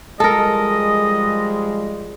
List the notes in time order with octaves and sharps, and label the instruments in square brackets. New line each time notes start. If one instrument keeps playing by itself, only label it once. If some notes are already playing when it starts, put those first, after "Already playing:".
[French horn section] F3 G3 G#3 [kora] A4 A#4 [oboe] D#5